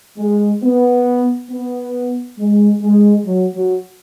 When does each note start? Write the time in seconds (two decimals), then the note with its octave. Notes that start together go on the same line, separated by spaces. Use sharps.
0.18 G#3
0.62 B3
1.50 B3
2.38 G#3
2.81 G#3
3.25 F#3
3.55 F#3